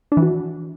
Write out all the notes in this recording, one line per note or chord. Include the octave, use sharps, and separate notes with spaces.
D4
E3
F#4